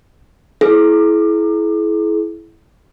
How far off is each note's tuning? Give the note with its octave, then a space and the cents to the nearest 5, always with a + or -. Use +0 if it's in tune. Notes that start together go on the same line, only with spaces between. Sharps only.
E4 +0 G#4 +40